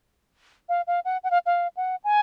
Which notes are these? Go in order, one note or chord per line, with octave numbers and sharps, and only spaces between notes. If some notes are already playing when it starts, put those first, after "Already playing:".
F5
F5
F#5
F#5
F5
F5
F#5
G#5